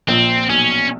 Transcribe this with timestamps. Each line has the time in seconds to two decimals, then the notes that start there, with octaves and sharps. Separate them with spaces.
0.08 A#1 A#2 C4
0.49 B1 B2 C#4